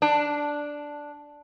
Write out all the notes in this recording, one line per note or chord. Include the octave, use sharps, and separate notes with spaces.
D4